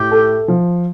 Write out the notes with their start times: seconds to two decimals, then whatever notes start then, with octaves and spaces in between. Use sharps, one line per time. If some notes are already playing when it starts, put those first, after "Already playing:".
Already playing: A2 G4
0.11 A4
0.48 F3